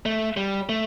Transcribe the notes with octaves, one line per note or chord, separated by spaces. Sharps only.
A3
G3
A3